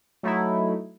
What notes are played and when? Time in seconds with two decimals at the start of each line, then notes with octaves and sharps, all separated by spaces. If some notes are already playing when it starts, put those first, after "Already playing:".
0.23 F#3 A3 D#4 E4